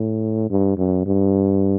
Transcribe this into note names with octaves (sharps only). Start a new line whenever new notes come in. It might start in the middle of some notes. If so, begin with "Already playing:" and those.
Already playing: A2
G2
F#2
G2